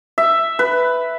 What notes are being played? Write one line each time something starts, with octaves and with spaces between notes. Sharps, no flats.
E5
B4